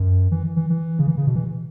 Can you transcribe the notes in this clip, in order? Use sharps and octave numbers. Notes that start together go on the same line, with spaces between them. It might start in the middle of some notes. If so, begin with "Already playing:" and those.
Already playing: F#2
E3
E3
E3
C#3
E3
C#3
B2
E3